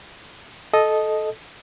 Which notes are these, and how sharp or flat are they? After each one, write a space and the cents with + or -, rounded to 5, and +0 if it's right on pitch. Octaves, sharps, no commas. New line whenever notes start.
A4 -15 D#5 +0